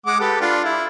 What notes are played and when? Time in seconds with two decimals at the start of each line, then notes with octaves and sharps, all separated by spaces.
0.06 G#3 F#5 D6
0.20 G4 A4 B4
0.41 D4 F4
0.64 E4